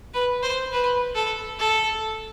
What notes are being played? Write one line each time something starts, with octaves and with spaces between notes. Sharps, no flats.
B4
C5
B4
A4
A4